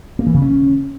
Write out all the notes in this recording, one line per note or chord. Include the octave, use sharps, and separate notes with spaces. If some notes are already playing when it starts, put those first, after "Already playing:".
A#3
E3
C#3
C#4